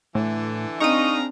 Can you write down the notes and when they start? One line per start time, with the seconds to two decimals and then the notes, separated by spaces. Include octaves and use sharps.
0.15 A2 D3 E3
0.80 C4 D4 D#4 G#4 F5 A#5 C#6 D#7